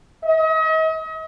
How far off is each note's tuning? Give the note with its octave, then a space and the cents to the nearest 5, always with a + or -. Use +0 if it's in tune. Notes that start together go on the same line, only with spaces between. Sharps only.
D#5 +40